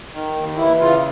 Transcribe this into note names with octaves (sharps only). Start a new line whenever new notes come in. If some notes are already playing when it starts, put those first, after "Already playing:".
D#3
D#2
E3 E4
C#3 F4